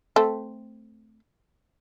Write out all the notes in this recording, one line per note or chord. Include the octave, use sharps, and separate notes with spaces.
A3 C4